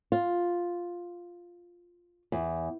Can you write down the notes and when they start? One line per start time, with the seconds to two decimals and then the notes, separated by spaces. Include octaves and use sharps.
0.12 F4
2.32 E2